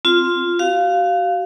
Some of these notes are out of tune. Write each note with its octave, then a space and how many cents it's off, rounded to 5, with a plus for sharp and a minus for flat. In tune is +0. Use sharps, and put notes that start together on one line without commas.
C4 +0 F4 +0
F#4 +40 F5 +0